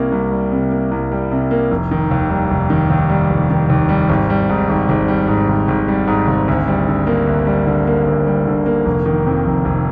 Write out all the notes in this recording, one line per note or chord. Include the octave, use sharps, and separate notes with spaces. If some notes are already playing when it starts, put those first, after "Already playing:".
Already playing: C2 C3 G3 A#3
C2
G3
C3
A#3
C2
G3
C3
A#3
F1
D#3
D#2
G3
F1
D#3
D#2
G3
F1
D#3
D#2
G3
G#1
G3
G#2
G#1
G#1
G3
G#2
G#1
G#1
G3
G#2
G#1
D2
G3
D3
A#3
D2
G3
D3
A#3
D2
G3
D3
A#3
F1
D#3
F2
F1
F1